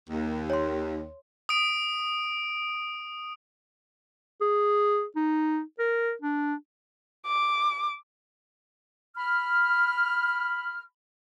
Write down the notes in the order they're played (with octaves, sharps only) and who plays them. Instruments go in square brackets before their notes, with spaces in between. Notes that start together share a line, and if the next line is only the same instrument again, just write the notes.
[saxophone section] D#2
[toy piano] C#5 C6
[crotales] D#6 D7
[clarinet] G#4
D#4
A#4
D4
[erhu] D6
[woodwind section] B5 F6